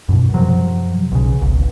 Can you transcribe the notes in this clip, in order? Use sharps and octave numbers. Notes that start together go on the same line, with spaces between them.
F#2 B2
F#2 C3 F3 F#3
B1 C#3
D1 G#1 C#2